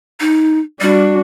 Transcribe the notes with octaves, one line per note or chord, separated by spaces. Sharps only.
D#4
G3 D4 F#4